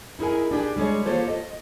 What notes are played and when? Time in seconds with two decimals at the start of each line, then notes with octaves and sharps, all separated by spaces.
0.19 D#4 E4 G#4 A#4 G#5
0.51 D4 G4 G#4
0.76 G3 G#3 G#4 C#5
1.06 A#3 F4 G4 A4 C5 C#5
1.28 D#5